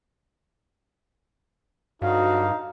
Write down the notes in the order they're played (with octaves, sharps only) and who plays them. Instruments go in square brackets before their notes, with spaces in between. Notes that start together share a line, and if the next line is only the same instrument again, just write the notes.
[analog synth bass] G2 [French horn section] D3 F#3 F#4 [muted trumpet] D#4 [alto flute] F5